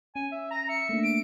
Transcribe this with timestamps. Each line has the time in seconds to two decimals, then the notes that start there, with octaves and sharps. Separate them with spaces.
0.16 C#4 G#5
0.32 E5
0.51 A#5 A#6
0.69 E5 C#7
0.89 A3 A#3 D4
1.04 D7